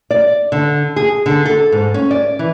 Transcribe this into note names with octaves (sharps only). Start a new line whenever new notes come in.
D5
D3
G#4
D3
A4
G#2
C#4
D5
E3